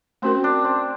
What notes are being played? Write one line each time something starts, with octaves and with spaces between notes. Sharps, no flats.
A3 C4 C#4 F#4 A#4
D4
C4